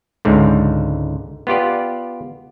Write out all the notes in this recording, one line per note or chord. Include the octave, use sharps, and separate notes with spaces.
C#2 G#2 D3
B3 F4 G4 D5